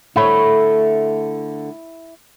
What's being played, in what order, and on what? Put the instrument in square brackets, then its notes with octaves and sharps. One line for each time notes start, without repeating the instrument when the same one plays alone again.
[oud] D3 A3 C#5 [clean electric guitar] E4